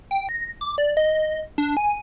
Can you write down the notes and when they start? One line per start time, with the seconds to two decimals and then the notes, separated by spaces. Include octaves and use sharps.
0.11 G5
0.29 A#6
0.61 D6
0.78 D5
0.97 D#5
1.58 D4
1.77 G#5